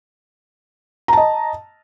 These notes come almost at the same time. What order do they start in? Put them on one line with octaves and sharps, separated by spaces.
A#5 A5 D#5